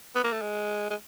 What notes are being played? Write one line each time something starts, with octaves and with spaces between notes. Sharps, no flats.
B3
A#3
A3
G#3
G#3